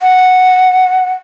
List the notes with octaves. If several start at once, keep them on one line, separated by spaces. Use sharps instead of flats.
F#5